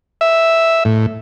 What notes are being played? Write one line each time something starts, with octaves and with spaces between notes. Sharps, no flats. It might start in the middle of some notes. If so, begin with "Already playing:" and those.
E5
A2